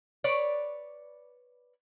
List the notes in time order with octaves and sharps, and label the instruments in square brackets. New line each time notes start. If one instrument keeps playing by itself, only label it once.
[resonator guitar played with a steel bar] B4 C#5 D5